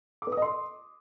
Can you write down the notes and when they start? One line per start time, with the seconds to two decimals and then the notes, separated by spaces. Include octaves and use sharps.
0.22 D6
0.27 B4
0.32 D#6
0.37 D#5
0.42 C6